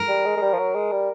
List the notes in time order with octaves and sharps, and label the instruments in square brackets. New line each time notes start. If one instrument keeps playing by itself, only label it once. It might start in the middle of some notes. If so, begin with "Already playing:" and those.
Already playing: [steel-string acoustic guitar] A#4
[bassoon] G3
G#3
G#3
G3
F3
F#3
G#3
G3